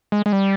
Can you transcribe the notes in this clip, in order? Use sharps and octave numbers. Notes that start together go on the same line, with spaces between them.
G#3
G#3
G3